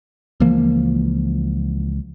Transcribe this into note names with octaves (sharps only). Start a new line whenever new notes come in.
C#2 E3 F3 A#3